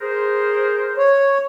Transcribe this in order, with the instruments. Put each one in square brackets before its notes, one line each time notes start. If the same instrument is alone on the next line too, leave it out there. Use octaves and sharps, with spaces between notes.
[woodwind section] G#4 A#4 C5
[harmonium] C#5